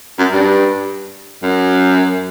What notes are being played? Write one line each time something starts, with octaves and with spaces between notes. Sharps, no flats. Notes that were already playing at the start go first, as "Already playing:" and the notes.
F#2
G2
F#2